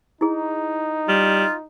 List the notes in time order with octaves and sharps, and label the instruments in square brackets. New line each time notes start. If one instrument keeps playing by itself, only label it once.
[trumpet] D#4 [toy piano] E4 G#4
[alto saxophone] G3 [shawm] F4